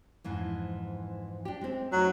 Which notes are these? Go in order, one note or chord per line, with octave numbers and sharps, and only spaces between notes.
F2 G#2 E3
D4 G4
G#3 C4
F#2 F#3 A3 D#4